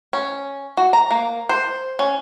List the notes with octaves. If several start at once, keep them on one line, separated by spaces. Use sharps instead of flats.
C#4
F#4
A#5
A#3
C5
C#4